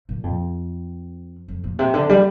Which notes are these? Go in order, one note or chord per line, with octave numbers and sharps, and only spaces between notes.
A#2
F2
F2
A#2
C3
D3
G3